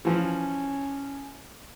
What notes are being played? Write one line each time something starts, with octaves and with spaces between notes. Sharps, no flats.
E3 F3 C#4